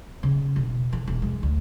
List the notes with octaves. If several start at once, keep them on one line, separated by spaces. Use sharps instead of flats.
C#3
E1
E3
E1
G#3
D2